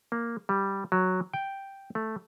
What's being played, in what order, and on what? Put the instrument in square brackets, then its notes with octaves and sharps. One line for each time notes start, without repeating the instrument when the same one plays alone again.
[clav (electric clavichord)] A#3
G3
F#3
G5
A3